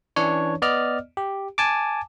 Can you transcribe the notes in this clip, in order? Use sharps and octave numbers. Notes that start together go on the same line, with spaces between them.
E3 C#4 D4 C#5
B3 D5 D#5 F6
G4
G#5 A5 D6